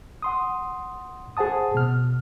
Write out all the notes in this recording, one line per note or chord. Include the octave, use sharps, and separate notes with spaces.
F#5 C6 D#6
G#4 C5 F#5 A5 D#6
B2 F6